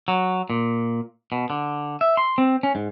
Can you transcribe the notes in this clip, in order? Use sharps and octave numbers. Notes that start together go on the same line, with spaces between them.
F#3
A#2
B2
D3
E5
C6
C4
C#4
G#2